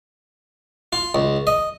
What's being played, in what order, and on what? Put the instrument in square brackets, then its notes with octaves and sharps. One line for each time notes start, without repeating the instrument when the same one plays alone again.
[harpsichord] F4
C#2
D#5